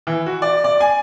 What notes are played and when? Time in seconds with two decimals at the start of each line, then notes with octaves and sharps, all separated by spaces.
0.07 E3
0.26 F#4
0.42 D5
0.64 D5
0.81 G#5